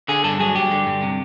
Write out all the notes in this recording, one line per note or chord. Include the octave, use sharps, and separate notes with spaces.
D3 G#4
G2 A4
F#3 G#4
G2 G4
D3
G2
C3